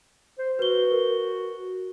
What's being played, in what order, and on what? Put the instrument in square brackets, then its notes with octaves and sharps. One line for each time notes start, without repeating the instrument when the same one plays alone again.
[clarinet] C5
[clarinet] F#4 [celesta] B4 G7
[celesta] A#4